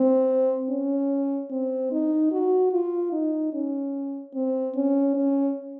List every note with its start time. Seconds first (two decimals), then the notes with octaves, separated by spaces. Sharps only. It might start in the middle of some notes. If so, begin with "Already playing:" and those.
Already playing: C4
0.69 C#4
1.50 C4
1.92 D#4
2.31 F#4
2.73 F4
3.13 D#4
3.53 C#4
4.34 C4
4.75 C#4
5.15 C#4